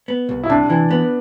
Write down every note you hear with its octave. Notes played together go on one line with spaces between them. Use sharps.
B3
C2
E4
C3 D4
E3
B3